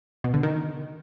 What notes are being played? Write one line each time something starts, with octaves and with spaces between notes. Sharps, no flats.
B2
D3
D#3